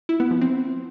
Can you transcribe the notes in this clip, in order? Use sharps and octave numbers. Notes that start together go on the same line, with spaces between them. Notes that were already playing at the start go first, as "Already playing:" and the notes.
E4
B3
F3
C4